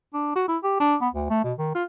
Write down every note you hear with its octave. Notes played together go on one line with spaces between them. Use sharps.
D4
F#4
E4
G4
D4
B3
D2
A3
B2
D#3
F4